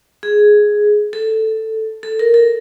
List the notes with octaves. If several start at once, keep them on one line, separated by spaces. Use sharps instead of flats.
G#4
A4
A4
A#4
A4